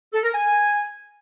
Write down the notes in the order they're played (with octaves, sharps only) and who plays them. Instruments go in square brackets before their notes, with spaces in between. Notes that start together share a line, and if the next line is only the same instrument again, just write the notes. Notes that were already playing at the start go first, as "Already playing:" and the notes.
[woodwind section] A4
A#4
G#5